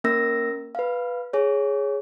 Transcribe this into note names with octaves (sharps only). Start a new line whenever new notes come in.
A#3 C#4 A#4 E6 A#6
B4 F5
G#4 C#5